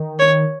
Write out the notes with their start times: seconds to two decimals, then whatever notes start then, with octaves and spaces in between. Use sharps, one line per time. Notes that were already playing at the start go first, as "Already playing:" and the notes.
Already playing: D#3
0.19 C#5